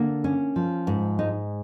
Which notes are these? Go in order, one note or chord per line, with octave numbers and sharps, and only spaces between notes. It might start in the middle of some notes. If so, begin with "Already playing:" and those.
Already playing: D3 A#3
C#4
F3
G#2
G#3 D#4